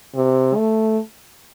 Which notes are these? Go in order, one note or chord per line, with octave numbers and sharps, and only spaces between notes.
C3
A3